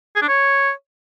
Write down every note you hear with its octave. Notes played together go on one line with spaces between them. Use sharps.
G#4
D4
C#5